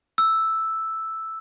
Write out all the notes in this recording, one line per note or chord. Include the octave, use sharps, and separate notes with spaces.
E6